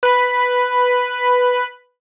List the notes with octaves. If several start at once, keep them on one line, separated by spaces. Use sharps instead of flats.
B4 B5